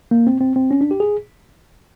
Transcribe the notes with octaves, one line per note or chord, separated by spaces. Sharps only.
A#3
C4
C4
C4
C#4
D4
G4
G#4